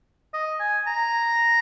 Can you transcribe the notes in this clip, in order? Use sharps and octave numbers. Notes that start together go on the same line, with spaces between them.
D#5
G#5
A#5